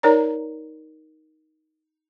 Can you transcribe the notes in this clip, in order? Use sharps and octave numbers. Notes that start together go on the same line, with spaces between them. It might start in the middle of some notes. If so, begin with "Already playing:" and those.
D#4 A#4 C#5 D5 A#5